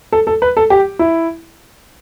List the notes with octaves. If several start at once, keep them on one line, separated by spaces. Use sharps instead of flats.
A4
A4
B4
A4
G4
E4